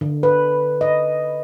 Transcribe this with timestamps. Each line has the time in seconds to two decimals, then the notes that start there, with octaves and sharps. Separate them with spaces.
0.01 D3
0.23 B4
0.81 D#5